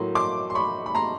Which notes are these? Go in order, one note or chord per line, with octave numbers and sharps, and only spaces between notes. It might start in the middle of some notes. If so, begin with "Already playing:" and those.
Already playing: A2 F#3 A#3 C6
C6 D6
C6
B5 C#6
B5
A#5 C6